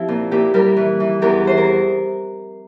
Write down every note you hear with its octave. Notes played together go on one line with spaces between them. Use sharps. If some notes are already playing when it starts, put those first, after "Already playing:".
Already playing: F3 C4 E4 G4
A#2
A#2 E4 G4
G3 G4 A#4
E3
E3
E2 G4 A#4
E3 C5
A#4